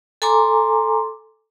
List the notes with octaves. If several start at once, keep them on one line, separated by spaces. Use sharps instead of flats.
A4 G#5 A#5 C6 D6